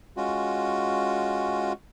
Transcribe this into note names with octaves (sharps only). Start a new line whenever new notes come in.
G#3 C#4 F4 F#4